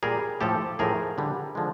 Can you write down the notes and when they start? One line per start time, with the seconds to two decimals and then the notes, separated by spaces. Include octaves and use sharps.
0.03 A#2 G3 G#4 A#4
0.41 A2 F3 A3 G4 A4
0.79 A2 F3 A3 G#4 A#4
1.18 D3 G3
1.55 D3 F3 G#3